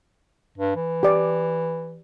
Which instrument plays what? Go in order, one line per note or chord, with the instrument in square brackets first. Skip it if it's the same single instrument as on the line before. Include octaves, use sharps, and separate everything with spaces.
[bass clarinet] G2
E3
[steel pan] G4 D5